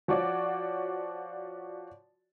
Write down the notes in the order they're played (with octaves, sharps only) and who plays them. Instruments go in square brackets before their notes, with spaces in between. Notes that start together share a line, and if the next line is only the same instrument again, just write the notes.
[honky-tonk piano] F3 F#4 C#5 D5